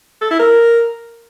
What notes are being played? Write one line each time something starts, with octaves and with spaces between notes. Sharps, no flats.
A4
E4
A#4